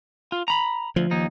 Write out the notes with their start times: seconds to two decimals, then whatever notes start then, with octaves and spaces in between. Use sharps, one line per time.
0.32 F4
0.48 A#5 B5
0.96 D2 F3
1.11 D#2 D#4